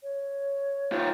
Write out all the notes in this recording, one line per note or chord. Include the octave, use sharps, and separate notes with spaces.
C#5
D#3 F4